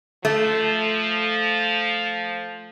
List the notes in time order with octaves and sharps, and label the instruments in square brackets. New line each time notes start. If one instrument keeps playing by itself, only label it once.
[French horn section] F3 [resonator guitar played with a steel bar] A3